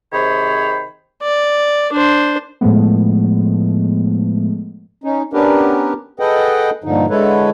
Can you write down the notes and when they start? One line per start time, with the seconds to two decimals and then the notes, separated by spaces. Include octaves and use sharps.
0.13 C3 D#3 G#4 C5 C#5 B5
1.23 D5
1.92 D4 C5
2.61 A2 F3 G#3 A3 B3
5.04 C#4 D#4
5.33 B3 C#4 D4 G4 A#4 B4
6.19 G#4 A4 B4 D#5 F#5 G5
6.84 G2 A#2 D3 F3 D#4
7.10 D3 G#3 E4 A4 B4 C#5